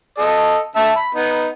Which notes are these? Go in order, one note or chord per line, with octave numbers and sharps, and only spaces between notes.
A4 D#5
D3 E5 A5
B5
B3 D#4